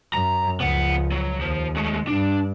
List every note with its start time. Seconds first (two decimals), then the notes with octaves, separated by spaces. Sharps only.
0.14 F#2 A#5
0.60 C#2 F3 B3 F#5
1.11 F#3
1.40 D#2 F3
1.76 G#3 A3
2.07 G2 D4